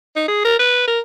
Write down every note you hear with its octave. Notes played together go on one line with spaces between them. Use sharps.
D#4
G#4
A#4
B4
A#4